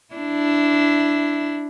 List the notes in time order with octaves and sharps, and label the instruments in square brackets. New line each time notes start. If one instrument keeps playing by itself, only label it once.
[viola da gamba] D4 E4